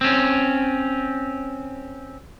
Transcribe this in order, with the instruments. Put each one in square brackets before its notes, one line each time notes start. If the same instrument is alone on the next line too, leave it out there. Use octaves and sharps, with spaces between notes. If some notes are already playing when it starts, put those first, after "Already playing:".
[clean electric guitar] C4 C#4